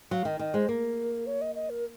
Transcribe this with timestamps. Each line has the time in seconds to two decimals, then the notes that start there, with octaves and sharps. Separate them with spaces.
0.11 F#3 F5
0.25 D#3 D#5
0.39 D#3 D#5
0.54 G#3 C5
0.69 A#3 A#4
1.27 C#5
1.41 D#5
1.55 D#5
1.70 A#4